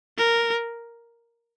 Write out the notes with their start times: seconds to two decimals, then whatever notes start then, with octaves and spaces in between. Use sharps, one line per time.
0.18 A#4